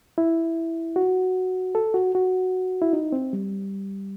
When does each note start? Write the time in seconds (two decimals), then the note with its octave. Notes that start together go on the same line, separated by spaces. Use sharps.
0.18 E4
0.96 F#4
1.75 A4
1.94 F#4
2.15 F#4
2.82 E4
2.93 D#4
3.12 C4
3.33 G3